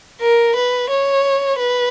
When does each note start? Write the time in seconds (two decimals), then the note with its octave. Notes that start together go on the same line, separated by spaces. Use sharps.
0.21 A#4
0.55 B4
0.90 C#5
1.59 B4